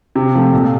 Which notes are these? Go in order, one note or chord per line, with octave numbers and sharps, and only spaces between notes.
C3
F3 A3
A#2